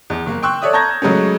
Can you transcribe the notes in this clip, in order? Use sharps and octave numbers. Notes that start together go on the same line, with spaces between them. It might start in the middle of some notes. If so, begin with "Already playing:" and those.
E2
F#1 A#3
G5 C6 C#6 E6 F#6
A4 C#5 D5 E5 D#6
A5 A#5 C#6 G6 G#6 A#6
C#3 F#3 G#3 A3 C#4